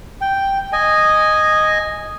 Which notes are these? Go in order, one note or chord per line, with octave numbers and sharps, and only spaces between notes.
G5
D#5 G#5